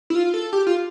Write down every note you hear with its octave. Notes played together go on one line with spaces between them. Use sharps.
E4
F4
A4
G4
F4